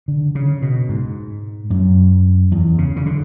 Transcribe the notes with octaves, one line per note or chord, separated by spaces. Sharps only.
D3
C#3
B2
G#2
F#2
E2
C#3
C#3
D3